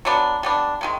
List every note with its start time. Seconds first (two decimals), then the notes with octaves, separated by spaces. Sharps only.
0.05 F#3 B3 D4
0.43 G3 B3 D4
0.81 C3 D#3 G#3